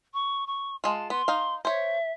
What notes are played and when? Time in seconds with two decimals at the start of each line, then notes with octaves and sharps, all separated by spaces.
0.14 C#6
0.47 C#6
0.84 G#3 F4 A5
1.10 B3 C6
1.28 D#4 F5
1.65 C5 C#5 E5